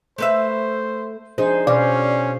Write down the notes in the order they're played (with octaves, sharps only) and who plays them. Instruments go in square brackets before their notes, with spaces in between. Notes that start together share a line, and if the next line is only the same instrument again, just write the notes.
[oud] A3 B4 E5 [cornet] C5
[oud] F3 D#4 [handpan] D4 G#4 C5
[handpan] B2 C5 F5 [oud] E3 [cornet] C#4 [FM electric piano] D5